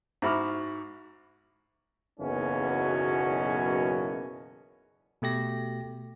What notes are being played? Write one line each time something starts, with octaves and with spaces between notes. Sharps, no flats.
G#2 E4 F#4 B5 D6 F6
F#1 B1 E2 B2 A#3 C#4
B2 A3 G4 A#6